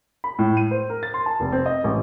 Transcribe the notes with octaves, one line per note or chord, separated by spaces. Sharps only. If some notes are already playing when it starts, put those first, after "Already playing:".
B5
A2
D#7
C5
A#4
A6
C6
A5
F1
C4
D#5
A1